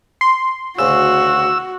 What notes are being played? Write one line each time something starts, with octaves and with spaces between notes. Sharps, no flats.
C6
D2 C#3 F#4 E6